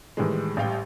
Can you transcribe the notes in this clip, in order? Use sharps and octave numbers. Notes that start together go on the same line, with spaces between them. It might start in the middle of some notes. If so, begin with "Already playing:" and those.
A2 D#3 E3 G3 G#3
A1 G3 F5 G5